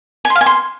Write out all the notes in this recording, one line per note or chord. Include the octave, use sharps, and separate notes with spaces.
G#5
C6
F5
G#5
C6